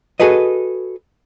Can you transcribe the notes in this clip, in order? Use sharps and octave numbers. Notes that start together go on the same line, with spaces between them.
F#4 G#4 A4 B4 D#5